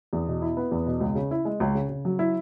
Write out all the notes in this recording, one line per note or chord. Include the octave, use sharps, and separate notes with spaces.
E2
B2
E4
B3
E2
B2
C#2
C#3
E4
G#3
C#2
C#3
C#3
F#3
E4